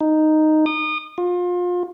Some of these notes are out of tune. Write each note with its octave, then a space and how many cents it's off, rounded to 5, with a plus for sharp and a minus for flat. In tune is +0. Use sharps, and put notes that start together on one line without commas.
D#4 -5
D#6 -30
F4 +30